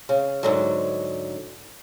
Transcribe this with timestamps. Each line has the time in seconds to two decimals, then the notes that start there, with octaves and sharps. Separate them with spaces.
0.09 C#3
0.43 G#2 D3 F#3